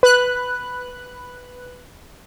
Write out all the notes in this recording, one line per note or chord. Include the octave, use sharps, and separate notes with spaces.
B4 F#6